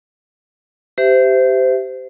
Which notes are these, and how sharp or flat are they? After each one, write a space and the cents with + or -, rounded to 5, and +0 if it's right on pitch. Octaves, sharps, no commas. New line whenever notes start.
G4 -10 C5 -25 E5 +5